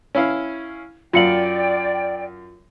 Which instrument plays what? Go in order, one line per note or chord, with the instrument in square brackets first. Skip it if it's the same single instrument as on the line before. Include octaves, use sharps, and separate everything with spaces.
[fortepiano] C#4 E4 F5
[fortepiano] F#2 F5 [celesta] F4 C#7 F#7 [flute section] D5 G5